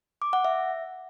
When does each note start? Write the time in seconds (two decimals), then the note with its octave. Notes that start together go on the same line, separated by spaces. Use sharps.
0.22 D6
0.33 F#5
0.45 E5